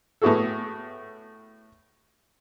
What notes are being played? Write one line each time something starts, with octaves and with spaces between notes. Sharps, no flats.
A2 B3 E4 F#4 G#4 A4